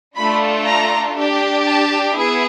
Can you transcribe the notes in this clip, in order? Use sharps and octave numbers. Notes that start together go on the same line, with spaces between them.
A3 D4 F4 B5
A#5
D4 G4
A5
B3 E4 G#4